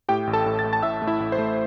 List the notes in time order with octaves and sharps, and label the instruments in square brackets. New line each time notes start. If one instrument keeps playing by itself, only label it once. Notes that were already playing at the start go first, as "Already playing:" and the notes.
[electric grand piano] A2 G4 G5
A1
A4 A5
A2
A6
A3
A5 A6
A2 E5 E6
A3
E4 E5
A1
C5
A3